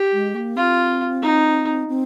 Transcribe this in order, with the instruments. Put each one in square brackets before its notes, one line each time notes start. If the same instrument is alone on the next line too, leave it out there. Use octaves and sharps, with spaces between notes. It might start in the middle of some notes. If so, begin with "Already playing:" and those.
Already playing: [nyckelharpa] G4
[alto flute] G#3
A#3
[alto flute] C4 [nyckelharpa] F4
[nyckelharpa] D#4
[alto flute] C4